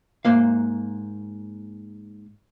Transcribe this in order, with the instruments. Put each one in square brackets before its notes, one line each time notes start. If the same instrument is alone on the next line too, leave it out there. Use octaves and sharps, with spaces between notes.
[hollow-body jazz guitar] G#2 A#3 F5